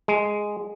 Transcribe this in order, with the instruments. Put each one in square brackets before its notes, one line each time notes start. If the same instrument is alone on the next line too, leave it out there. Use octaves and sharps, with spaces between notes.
[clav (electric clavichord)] G#3